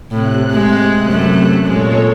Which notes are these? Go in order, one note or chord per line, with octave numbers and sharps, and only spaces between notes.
A2 C3 F#6
G#3
F#2 A3
A#2 G#3 A4 C#5